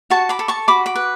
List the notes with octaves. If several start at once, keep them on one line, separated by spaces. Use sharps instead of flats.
F#4 A5 C#6
B5 D6
A4
A5 C#6
F#4 B5 D6
B5 D6
B4